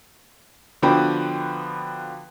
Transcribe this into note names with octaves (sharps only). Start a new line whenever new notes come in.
D3 F3 B3 F#4 B4 G5